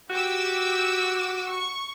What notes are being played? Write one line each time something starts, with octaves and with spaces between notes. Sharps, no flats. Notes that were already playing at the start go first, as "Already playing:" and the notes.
F#4 G4 D6 E6
C#6